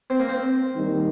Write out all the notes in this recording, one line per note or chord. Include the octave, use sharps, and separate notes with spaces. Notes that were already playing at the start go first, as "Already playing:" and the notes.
C4
A#3
C4
D#3 G3 A#3 D#4